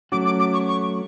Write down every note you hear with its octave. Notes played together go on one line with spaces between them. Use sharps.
F#3 A3 C#4 F#4 D6
D6
D6
C#6
C#6